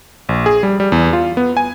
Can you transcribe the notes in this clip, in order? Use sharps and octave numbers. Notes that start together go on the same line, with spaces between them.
A#1
G#4
G3
G3
E2
F4
B3
G#5